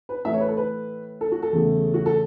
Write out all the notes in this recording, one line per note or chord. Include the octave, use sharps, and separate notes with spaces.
B4
A2 E3 A3 E5
C#5
B4
A4
B4
A4
F#4
A4
E2 C#3 A3
F#4
A4